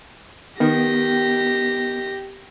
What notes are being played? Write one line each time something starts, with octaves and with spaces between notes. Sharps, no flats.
D#3 B3 G4 A#6